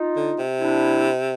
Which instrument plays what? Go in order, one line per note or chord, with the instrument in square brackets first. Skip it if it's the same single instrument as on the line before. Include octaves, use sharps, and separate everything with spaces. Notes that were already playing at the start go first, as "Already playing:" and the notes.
Already playing: [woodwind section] D#4 F4
[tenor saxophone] D3
C3
[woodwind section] D4 E4